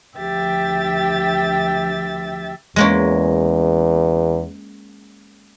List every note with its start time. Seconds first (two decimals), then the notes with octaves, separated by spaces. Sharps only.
0.18 D2 F3 G4 E5 G5 A6
2.76 E2 G#3 A#3 C#4